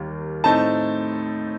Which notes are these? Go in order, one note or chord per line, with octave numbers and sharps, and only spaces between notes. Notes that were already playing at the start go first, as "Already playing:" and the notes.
Already playing: D#2 D#3 G3 A#3
A2 A3 C4 D#4 A5